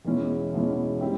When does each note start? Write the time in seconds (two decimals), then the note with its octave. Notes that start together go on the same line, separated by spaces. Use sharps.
0.05 E2 B2 G#3 C#4 E4
0.53 E2 B2 G#3 C#4 E4
1.01 G3 C4 E4 G4